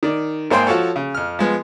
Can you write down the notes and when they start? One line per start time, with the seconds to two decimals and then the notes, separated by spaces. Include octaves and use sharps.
0.03 D#3 D5
0.51 G#1 A#3 G#4 C5 G5 C6
0.67 F3 F#4 A4 C#5
0.96 C#3
1.15 F2 F6
1.39 F3 G#3 B3